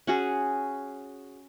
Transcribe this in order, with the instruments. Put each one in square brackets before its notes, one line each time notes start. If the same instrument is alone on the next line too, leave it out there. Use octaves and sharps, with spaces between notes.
[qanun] C#4 F#4 G#4